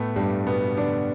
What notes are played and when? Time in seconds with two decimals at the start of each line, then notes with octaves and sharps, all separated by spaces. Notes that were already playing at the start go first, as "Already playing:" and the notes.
Already playing: A2 A3 B3
0.16 G2 G3
0.46 B2 B3
0.77 D3 D4